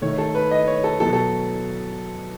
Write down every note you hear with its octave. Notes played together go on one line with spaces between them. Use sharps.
D#3 A3 C#5
A4
B4
D#5
C#5
A4
B2 F#3 B3 A4
A4